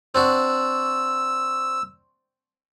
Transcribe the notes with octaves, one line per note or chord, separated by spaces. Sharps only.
C4 D4 F#4 E6